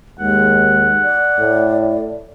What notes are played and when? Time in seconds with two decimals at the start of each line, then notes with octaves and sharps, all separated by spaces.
0.19 D#2 G#3 F#5
1.02 D5
1.38 A2